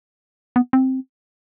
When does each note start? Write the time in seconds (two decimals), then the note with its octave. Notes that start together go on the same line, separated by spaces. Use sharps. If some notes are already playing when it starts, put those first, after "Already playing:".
0.56 B3
0.73 C4